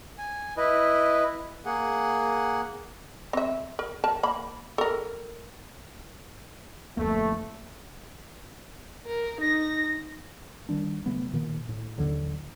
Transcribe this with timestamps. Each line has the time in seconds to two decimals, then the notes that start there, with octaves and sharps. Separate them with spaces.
0.18 G#5
0.57 E4 B4 D#5
1.66 A#3 G#4 F#5
3.33 C4 E5
3.79 A#4
4.04 A#4 A5
4.23 A#3 B5
4.78 A4 A#4
6.97 D1 F2 A3 A#3
9.07 A#4
9.41 D#4 A#6
10.69 D#3 G3 D4
11.06 C3 F#3 A3 B3
11.33 A#2 D#3 A#3
11.69 A2
11.98 A1 D#2 D3 F#3